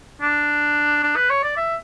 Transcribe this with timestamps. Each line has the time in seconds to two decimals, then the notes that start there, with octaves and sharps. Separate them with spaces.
0.22 D4
1.03 D4
1.16 B4
1.30 C#5
1.43 D5
1.57 E5